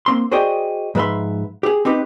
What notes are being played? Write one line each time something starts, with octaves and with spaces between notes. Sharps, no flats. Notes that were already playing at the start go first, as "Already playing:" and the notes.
A#3 C4 C6
F#4 G#4 C5 D5 D#5 G5
G#2 F3 B4 E5 B5 C6
G4 G#4
C4 D#4 G4 B4